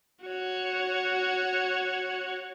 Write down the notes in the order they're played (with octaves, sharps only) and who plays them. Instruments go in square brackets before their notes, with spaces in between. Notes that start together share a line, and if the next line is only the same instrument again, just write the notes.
[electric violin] F#4 C#5